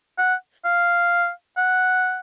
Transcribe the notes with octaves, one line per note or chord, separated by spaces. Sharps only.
F#5
F5
F#5